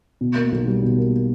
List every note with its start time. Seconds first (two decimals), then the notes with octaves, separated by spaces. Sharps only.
0.21 B2
0.36 A#3
0.52 B1
0.67 G3
0.83 B2
0.98 A#3